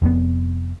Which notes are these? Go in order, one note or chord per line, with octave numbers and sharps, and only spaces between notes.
F1 F2 A#2 B3